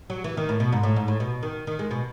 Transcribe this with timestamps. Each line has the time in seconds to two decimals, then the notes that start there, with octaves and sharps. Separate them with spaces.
0.10 F#3
0.24 E3
0.37 D#3
0.49 A2
0.60 B2
0.72 G#2
0.83 A2
0.96 G#2
1.08 A2
1.20 B2
1.43 D#3
1.67 D#3
1.79 G#3
1.91 B2